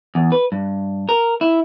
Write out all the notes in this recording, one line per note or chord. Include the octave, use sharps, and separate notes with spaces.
E2
B4
G2
A#4
E4